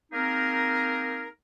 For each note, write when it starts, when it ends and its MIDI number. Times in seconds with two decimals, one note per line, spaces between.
0.12 1.26 58
0.12 1.26 60
0.12 1.26 63
0.12 1.26 68
0.12 1.26 70